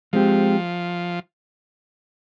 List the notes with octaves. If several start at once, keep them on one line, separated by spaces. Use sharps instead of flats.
F3 G#3 C4 G4